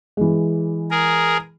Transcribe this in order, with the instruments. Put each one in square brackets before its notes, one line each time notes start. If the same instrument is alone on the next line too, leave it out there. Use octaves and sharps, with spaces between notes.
[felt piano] E3 G#3
[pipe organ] G#4 A#4